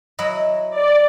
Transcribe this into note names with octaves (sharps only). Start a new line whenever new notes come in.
F#3 E4 D#5
D5